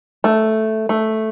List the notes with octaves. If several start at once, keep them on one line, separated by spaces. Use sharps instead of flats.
A3
A3